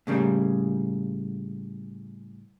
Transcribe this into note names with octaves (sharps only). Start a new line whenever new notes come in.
A2 C#3 G3 A#3